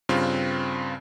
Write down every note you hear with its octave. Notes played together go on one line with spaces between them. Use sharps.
G2 C#3 C4 F4